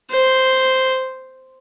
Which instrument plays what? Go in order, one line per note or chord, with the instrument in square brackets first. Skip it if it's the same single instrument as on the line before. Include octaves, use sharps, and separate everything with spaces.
[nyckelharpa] C5